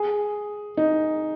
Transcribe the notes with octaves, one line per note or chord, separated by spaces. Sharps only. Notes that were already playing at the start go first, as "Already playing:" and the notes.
Already playing: G#4
D#4